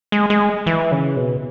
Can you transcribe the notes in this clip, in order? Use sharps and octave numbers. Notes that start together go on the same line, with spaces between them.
G#3
G#3
E3
C#3
B2